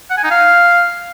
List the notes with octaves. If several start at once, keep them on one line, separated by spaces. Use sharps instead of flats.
F#5
G#5
D#4
F5